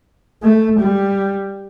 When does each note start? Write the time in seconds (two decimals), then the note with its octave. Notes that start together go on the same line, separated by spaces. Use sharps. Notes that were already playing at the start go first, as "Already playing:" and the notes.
0.42 A3
0.80 G3